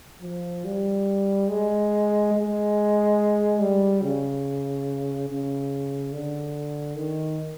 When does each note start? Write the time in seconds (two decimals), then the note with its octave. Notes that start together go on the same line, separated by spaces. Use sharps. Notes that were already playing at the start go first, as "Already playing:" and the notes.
0.22 F3
0.65 G3
1.49 G#3
2.34 G#3
3.60 G3
4.02 C#3
5.29 C#3
6.12 D3
6.97 D#3